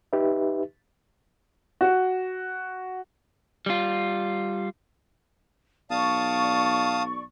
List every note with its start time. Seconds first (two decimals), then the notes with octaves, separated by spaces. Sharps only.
0.13 D#4 G4 B4 E5
1.81 F#4
3.66 G3 F4
5.90 B1 D5 F5 A5 C#6 D#6